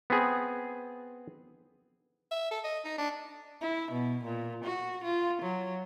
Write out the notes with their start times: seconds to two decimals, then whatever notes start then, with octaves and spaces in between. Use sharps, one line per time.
0.10 B3 C4 G#4
2.31 E5
2.51 A4
2.64 D#5
2.85 D#4
2.98 D4
3.61 E4
3.91 B2
4.24 A#2
4.64 F#4
5.04 F4
5.42 F#3